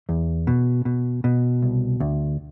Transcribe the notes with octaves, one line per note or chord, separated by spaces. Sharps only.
E2
B2
B2
B2
C2
D2